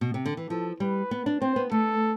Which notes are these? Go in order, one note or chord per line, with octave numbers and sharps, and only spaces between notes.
B2
C3
D3
E3
F3 A4
G3 B4
B3
D4
C4 C5
B3
A3 A4